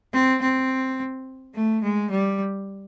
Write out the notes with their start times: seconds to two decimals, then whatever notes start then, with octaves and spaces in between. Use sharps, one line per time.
0.13 C4
0.42 C4
1.54 A3
1.83 G#3
2.11 G3